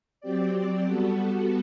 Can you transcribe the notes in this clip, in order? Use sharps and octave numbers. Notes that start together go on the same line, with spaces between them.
F#3 C4 G4 D5
G3 B3 F#4 A4